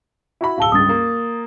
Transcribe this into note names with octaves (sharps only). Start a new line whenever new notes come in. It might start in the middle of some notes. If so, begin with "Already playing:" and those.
E4 F#4 B5
D1 F5 A5 E6 G7
C#2 G2 D#6 A6
A#3